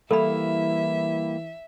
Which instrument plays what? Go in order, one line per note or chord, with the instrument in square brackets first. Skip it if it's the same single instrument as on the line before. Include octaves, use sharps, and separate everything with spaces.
[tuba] E3 [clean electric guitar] G3 A#3 E4 [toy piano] A4 B5 [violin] E5